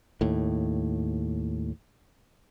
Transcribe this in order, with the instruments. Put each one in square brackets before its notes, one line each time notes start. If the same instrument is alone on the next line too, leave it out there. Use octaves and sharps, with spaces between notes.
[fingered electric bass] D#2 A2